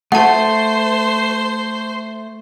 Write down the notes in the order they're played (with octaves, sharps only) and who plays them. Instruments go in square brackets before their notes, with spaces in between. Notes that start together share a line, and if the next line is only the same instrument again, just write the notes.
[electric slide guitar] A3 [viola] C5 [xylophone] F#5 A5